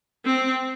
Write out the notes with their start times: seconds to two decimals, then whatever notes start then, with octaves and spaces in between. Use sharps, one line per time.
0.25 C4